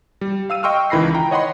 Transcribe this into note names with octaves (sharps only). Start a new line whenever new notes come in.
G3
F5 E6 D#7
D#5 G5 C6 C#6 E6 F6
C#2 D#3 E3 B5 A#6 C7
G5 A#5
C#5 D#5 F#5 B5 C6